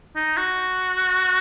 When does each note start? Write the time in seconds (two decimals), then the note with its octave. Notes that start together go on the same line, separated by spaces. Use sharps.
0.16 D#4
0.37 F#4